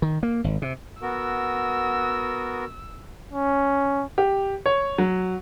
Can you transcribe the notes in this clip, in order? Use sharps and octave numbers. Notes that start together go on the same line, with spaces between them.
D#3
A#3
G#1
C3
B3 F#4 A#4 E6
C#4
G4
C#5
F#3